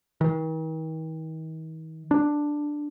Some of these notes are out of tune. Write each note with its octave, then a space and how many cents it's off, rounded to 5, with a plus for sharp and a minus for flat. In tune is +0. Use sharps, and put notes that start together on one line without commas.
D#3 +45
D4 +5